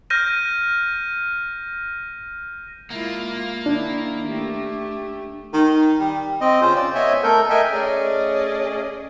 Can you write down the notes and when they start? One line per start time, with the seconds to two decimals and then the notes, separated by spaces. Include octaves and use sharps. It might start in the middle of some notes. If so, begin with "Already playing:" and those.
0.10 F6 G6 A#6 D#7
2.90 G#3 A#3 E4 F4
3.66 D#3 D4 E4
4.27 A3 G4
5.53 D#3
6.00 G3
6.41 C4 D#5
6.61 C#3 C#4 F4 C5
6.75 D5
6.95 B3 C#5 D#5 E5 G#5
7.23 A3 A4 A#4 G6
7.50 A3 A#4 D#5 E5 G5 G#5
7.72 A3 C#4 G#4 D5 D#5